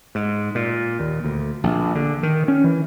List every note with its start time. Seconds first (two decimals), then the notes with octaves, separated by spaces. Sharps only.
0.15 G#2
0.55 A#2
1.00 D#2
1.24 D2
1.63 A#1
1.95 D3
2.23 D#3
2.48 C#4
2.64 E3